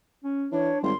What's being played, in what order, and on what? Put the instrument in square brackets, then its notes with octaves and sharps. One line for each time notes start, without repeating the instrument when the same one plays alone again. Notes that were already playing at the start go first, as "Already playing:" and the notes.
[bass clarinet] C#4
[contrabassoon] E3 [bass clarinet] D4 [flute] C#5
[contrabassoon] G#1 [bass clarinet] G3 [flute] C6